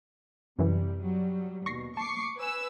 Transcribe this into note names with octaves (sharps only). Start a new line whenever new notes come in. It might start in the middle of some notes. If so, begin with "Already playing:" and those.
F#2 C3 E3 G3
F#3 G3
D#2 B2 C#6 A#6 C7
A5 C#6 D6 C7
B4 G#5 E6